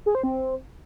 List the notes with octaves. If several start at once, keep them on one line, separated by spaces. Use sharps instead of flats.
G#4
C5
C4